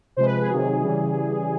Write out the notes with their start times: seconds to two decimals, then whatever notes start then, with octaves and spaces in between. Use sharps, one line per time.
0.17 C3 F3 G#3 C5
0.25 B4
0.41 G#4
0.49 C3 D#3 F#3
0.82 C#3 E3 G3